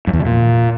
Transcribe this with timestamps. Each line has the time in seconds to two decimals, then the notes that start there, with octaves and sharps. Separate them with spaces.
0.07 F#2
0.13 E2
0.20 D3
0.26 A#2